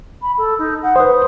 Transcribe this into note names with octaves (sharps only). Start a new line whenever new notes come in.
B5
A4
D#4
F#5
B4 C5 D#6